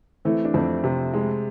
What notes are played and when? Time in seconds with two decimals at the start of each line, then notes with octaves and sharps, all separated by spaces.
0.25 E3 A3 C4
0.45 D4
0.54 F2 A3 C4
0.84 C3
1.13 G#3